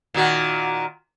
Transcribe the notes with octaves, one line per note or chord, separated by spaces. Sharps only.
A#2 D#3 F#4